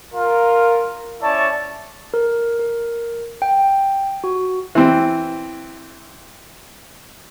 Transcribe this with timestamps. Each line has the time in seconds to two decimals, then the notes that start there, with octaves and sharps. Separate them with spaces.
0.14 F4 A#4
1.22 C#4 E4 C#5 D5 A5
2.14 A#4
2.60 A#4
3.42 G5
4.24 F#4
4.75 E3 C4